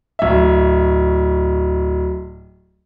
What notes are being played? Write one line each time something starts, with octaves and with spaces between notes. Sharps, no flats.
D1 E5